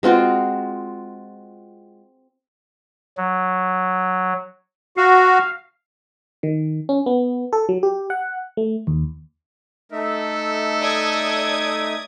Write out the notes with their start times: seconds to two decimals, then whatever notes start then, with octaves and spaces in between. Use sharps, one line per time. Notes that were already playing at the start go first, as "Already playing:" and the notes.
0.03 G#3 C4 F4 F#4
3.18 F#3
4.97 F#4 F5
6.43 D#3
6.89 C#4
7.06 B3
7.53 A4
7.69 F#3
7.83 G4
8.10 F#5
8.57 A3
8.87 D#2
9.92 A3 D#4 A4 E5
10.79 D5 D#6 G#6